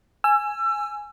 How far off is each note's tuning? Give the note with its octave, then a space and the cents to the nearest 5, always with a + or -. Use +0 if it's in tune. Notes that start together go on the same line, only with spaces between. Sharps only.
G#5 +0 E6 +30